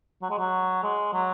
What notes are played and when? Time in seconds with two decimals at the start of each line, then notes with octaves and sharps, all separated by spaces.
0.22 F#3
0.30 G#3
0.38 F#3
0.83 G#3
1.13 F#3